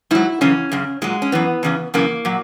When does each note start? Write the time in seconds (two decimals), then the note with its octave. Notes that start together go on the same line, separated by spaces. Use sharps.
0.11 G#2 F#3 E4
0.41 F#2 C#3 E3 C#4
0.72 F#2 C#3
1.02 A#2 F#3 G#3
1.22 C#4
1.32 F#2 E3 B3
1.63 E2 C#3 E3
1.94 F#2 C#3 E3 A#3
2.25 A#2 F#3